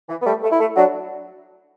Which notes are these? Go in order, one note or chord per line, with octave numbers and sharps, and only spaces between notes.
E3
B3
G3 A3
A3
E4
A3
F#3 D4